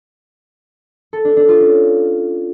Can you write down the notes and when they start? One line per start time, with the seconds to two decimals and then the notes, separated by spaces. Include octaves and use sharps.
1.13 A4
1.25 D4
1.37 D4
1.49 F4
1.60 C#4